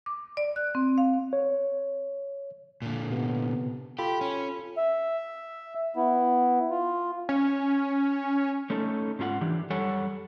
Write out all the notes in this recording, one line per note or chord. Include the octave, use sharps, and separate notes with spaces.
D6
D5
F#6
C4
F5
C#5
A#2 D3
C3 B3
F4 G4 A4 B5
C#4
E5
B3 E4
F4
C#4
A3 C#4 D#4 A4
G#2 C#4 F4 G4 F#5
E3 D4 G4
F#2 G3 A4 C#5 F#5 G#5